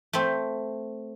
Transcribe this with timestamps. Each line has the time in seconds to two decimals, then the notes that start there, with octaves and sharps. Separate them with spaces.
0.13 A3 C4